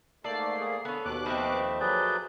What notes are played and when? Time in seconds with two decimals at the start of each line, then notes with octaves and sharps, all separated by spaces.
0.24 G#2 A3 A#3 A4 D5 C7
0.61 G#4
0.85 D3 B3 C#4 A4
1.05 D#2 B2 D6 F#6
1.26 F3 A3 C4 D#5 B5
1.80 F#3 G#4 B4 D5 G6